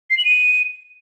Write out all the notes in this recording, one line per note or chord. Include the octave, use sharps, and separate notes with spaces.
C7
F#7
D#7